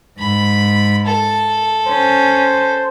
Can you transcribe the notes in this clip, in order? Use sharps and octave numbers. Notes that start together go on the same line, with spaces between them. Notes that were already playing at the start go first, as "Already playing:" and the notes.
G#2 B5
A4
C#4 C5